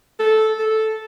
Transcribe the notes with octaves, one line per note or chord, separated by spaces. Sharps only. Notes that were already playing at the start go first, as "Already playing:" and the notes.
A4
A4